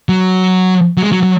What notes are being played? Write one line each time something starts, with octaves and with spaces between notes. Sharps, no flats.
F#3
F#3
G#3
F#3
F#3